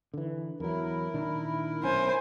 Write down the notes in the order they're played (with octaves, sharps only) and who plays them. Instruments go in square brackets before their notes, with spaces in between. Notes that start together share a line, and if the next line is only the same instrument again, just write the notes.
[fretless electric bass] D3 E3
[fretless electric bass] E2 F#3 [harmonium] E4 A#4
[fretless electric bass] A#2 D#3 D4
[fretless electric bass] B1 C#4 [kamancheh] C5 G#5